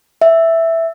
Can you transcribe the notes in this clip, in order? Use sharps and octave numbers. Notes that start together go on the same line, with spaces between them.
E5